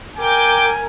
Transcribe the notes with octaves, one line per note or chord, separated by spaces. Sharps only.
A#4 G5 G#5 D6